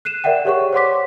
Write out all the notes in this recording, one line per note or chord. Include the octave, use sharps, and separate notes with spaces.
F#6 C7 D#7 E7
A#4 D5 E5 F#5 G5
G4 G#4 C#5 F#5 C#6
C5 C#5 F#5 C6 D6 B6